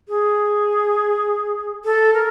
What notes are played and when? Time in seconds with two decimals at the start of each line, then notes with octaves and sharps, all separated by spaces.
0.09 G#4
1.85 A4
2.14 A#4